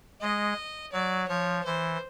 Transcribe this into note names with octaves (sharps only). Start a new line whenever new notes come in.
G#3 D#5
F#3 D5
F3 C#5
E3 C5